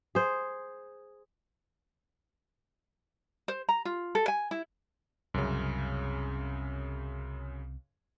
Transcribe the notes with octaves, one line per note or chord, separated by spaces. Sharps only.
G#4 C5
C5
A#5
F4
A4
G#5
E4
C2 F#2 C#3